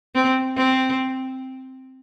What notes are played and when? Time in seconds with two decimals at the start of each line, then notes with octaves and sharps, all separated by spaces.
0.15 C4
0.57 C4